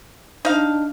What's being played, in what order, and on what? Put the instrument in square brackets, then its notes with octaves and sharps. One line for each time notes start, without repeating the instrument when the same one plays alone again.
[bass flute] D4 [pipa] D#4 F5